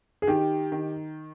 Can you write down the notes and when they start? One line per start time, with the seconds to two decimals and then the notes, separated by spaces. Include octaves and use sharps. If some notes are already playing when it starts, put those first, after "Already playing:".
0.22 G#4
0.27 D#3 G4
0.72 D#3